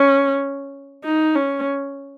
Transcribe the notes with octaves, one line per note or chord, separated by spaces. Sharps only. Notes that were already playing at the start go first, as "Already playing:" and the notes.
Already playing: C#4
D#4
C#4